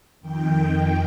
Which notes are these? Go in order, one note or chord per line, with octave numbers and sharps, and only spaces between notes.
F2 D#3 G5